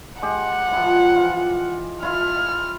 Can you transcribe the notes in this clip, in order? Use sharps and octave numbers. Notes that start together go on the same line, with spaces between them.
G#3 G4 F#5
F3 E4
E3 F4
E4 F4 F6